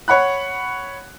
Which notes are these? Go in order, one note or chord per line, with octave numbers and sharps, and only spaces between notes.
C#5 F#5 B5 F#6